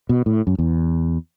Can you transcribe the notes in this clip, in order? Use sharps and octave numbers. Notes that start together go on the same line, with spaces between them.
B2
A2
F#2
E2